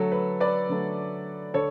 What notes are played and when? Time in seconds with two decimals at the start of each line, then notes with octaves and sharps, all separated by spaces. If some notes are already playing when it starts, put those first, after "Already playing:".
Already playing: D3 F#3 A3 A4
0.12 B4
0.40 B4 D5
0.69 D3 F#3 A3
1.54 D3 A4 C#5